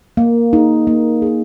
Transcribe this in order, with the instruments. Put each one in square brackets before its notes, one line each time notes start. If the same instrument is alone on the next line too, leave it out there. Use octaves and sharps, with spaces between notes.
[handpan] A#3
D#4 G#4
A#3
D#4 G#4